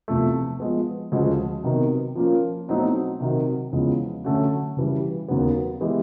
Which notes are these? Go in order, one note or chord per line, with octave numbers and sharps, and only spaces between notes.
E2 C3 F3 A3
F3 G#3 B3
D2 C#3 F3 G#3
C3 D#3 F#3 B3
F3 A#3 C#4 F4 A#4
B2 F#3 A3 C4 D#4
C3 D#3 F#3
E2 C#3 F3 G#3
D3 F#3 A3 C#4 F#4
C#3 E3 G3
D#2 C#3 F#3 B3
E3 G#3 B3 E4 G4